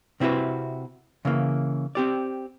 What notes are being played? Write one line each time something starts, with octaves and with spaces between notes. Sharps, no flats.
C3 C4 E4 F#4 B4
C#3 E3 A#3
C4 G4 D5